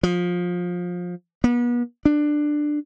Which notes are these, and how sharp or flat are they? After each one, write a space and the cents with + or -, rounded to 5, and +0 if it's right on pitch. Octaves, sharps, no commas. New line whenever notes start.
F3 +20
B3 -40
D4 +15